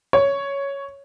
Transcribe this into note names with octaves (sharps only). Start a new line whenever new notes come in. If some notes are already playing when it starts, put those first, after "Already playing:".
C#5